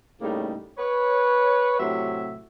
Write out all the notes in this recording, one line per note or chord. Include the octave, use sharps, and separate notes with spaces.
A2 C#3 G3 A#3 D#4
B4 C#5
A2 C3 F#3 F#4 E5